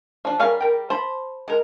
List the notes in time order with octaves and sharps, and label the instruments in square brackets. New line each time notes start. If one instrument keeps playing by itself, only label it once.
[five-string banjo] F3 D4
[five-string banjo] G3 G#4 F5 [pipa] C#4 A#4
[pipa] A#4 G5
[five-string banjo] C5 [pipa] A5 B5
[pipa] G#3 A#4